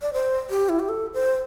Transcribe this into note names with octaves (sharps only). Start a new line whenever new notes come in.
D5
C5
G4
E4
G4
A4
C5